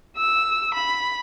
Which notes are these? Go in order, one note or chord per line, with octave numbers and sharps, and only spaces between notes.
E6
B5